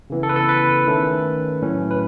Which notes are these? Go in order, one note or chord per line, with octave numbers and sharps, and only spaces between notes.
C#3 E3 B3
A4
B4
A4
B4
D#3 A3 C#4
A2 F#3 C#4
B4